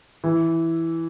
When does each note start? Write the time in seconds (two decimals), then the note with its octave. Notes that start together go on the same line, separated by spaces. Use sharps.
0.24 E3